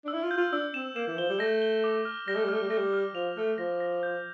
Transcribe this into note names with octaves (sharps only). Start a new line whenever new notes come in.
D4 E6
E4
F4
G6
F4
D4 E6
C4 E7
A#3 E7
E3
F3 G7
G3
A3 A#6
G7
D6
F6
G3 A#6
A3
G3
A3 F6
G3
A3 A#6
G3
F6
F3 F7
A3 F6
F3 A#6
A#6
G6